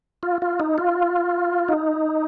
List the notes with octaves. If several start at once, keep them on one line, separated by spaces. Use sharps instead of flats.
F4
F4
D#4
F4
D#4